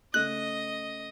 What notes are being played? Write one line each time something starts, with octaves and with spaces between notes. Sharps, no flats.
C#3 A3 D#5 F#6